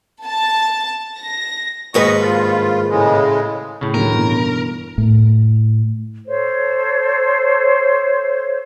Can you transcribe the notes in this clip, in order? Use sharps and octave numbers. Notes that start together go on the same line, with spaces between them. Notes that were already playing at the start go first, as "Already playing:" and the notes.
A5
A#6
D#2 G#2 B4 D#5 C#6
G2 F4
A2 C#3 G#3
A2 C#3
D2 D#3 F#3 A#4
G2 B2 E3
A2
A4 C5 C#5